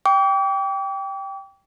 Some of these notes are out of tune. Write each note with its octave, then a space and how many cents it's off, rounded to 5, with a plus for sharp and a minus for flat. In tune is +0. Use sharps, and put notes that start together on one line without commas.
G5 +0 D6 -40